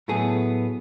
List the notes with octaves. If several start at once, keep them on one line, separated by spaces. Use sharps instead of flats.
A2 F#3 A3 B3 G#4